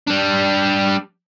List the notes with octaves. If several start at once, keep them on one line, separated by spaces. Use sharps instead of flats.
G3 D4